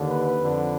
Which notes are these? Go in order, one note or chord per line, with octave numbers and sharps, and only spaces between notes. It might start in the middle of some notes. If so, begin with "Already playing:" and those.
Already playing: D#2 D3
B4
F2 D3